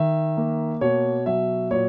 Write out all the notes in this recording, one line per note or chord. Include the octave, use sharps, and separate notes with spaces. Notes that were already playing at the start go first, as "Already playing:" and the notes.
Already playing: D#3 E5
A#3
B2 C#5
F#3 E5
A#2 C#5